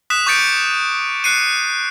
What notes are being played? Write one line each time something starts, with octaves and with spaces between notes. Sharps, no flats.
D#6 F#6 B6 E7
C#6 D6 G6 A6 C#7 D7
F#6 C7 C#7 D#7